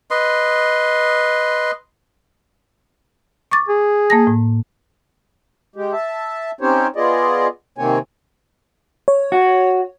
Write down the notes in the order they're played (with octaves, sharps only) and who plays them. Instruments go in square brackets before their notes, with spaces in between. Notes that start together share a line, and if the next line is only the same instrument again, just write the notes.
[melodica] B4 D#5 C6
[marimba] C#6 D6 A6
[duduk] G#4
[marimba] A#3 A5 A#6
A2
[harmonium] G#3 G4
E5 A5
C4 C#4 D#4 G4 C5 C#5
B3 F4 G#4 D5 D#5
C3 D#3 A#3 C4 C#5 G#5
[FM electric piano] C#5
[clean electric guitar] F#4